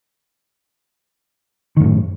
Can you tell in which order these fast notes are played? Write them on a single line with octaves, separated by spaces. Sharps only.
D#3 F#2 A2